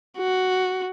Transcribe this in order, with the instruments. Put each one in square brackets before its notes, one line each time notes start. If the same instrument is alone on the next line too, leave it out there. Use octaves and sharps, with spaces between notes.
[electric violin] F#4